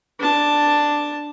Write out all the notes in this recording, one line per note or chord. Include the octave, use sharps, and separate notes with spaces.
D4 A5